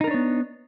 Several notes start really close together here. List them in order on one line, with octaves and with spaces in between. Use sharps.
D#4 A#4 D4 C#5 B3